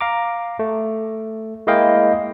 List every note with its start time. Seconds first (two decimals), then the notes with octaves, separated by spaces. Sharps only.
0.01 F5 A#5 D6
0.59 A3
1.67 G#3 A#3 E4 D#5 F5 G5